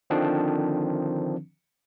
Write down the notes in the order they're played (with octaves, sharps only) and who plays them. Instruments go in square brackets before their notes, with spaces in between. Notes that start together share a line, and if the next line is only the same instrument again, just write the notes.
[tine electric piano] D3 D#3 F3 C4 D4